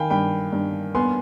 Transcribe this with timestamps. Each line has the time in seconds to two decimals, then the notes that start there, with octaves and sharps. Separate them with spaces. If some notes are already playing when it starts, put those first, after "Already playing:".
Already playing: D#3 F5 G5 G#5 B5
0.10 G2 G5 B5
0.53 G2
0.95 B3 G#5 C6